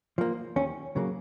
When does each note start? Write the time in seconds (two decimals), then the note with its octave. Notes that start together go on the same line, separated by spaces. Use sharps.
0.18 F3 A#3
0.56 D#2 C#4
0.96 C#3 F#3 A#3